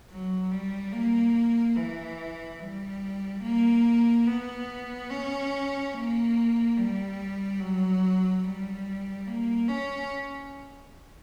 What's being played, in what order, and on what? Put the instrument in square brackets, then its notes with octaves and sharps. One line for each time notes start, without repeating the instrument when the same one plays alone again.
[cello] F#3
G3
A#3
E3
G3
A#3
B3
C#4
A#3
G3
F#3
G3
A#3
C#4